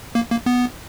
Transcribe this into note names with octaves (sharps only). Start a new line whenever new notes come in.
A#3
A#3
B3